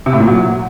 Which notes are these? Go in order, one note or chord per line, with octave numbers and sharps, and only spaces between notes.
C3
A2
A#2
F#3